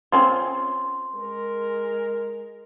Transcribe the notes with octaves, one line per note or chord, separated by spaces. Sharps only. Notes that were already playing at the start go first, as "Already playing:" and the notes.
C4 C#4 F4 C6
G#3 G#4 A#4